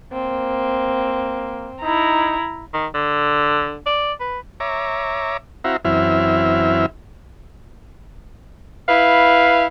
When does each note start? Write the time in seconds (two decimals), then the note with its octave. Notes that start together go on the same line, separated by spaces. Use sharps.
0.13 A#3 C4
1.83 D#4 E4 A#5
2.74 D#3
2.94 D3
3.86 D5
4.21 B4
4.60 C#5 E5 A#5 D6
5.64 C4 E4 F#4 E5 F5 A#5
5.85 F#2 E3 C4 E4 E5 F6
8.88 E4 B4 F5